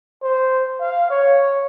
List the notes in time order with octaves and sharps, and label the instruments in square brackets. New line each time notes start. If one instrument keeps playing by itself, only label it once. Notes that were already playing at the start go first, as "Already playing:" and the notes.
[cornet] C5
F5
C#5